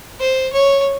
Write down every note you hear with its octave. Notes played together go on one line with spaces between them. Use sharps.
C5
C#5